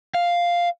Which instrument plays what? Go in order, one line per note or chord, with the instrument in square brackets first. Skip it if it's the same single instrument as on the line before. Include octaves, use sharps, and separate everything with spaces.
[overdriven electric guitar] F5